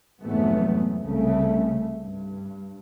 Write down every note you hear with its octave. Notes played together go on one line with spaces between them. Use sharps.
F1 E2 G#2 F#3 A3 B3
C2 C#3 A3
G2